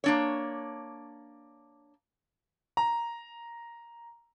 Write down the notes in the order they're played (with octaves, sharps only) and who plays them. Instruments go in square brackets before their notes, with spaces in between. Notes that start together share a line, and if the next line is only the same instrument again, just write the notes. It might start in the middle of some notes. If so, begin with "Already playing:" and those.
[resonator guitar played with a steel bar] A#3 D4 C#5
[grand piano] A#5